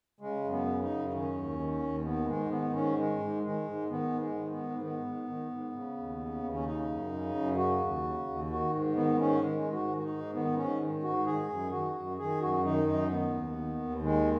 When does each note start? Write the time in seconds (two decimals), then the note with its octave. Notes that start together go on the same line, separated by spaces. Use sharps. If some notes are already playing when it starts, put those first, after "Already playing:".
0.20 C#3 G#3
0.44 F#2
0.52 B3
0.66 C#3
0.82 D#4
0.90 F#2
1.08 D#4
1.12 D#3 C#4
1.35 D#2
1.59 D#3
1.82 D#2
2.05 D#3 B3
2.28 G#2 G#3
2.50 D#3 B3
2.74 G#2 C#4
2.96 D#3 G#3
3.20 G#2
3.42 D#3 G#3
3.66 G#2
3.89 D#3 B3
4.12 G#2
4.20 G#3
4.35 D#3
4.51 B3
4.58 G#2
4.81 D#3 B3
5.04 G#2
5.27 D#3
5.50 G#2
5.73 C#3
5.97 D#2
6.19 C#3
6.42 D#2
6.53 C#4
6.65 C#3 D#4
6.88 F#2
7.11 C#3
7.35 F#2
7.57 C#3 F#4
7.81 D#2
8.03 C#3
8.27 D#2
8.49 D#3 F#4
8.73 G#2
8.96 D#3 B3
9.18 G#2 C#4
9.41 D#3 G#3
9.64 G#2
9.73 F#4
9.88 D#3
9.97 F#4
10.03 D#4
10.11 G#2
10.34 D#3 B3
10.57 G#2 C#4
10.80 D#3
11.03 G#2 F#4
11.26 D#3 G#4
11.49 F#2
11.72 D#3 F#4
11.95 F#2
12.18 D#3 G#4
12.41 F#2 F#4
12.64 D#3 D#4
12.87 F#2 D#4
13.10 D#3 B3
13.33 D#2
13.56 D#3
13.79 D#2
14.02 D#3 G#3